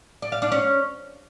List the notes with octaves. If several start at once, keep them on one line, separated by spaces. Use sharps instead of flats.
D5
F5
D4
C#4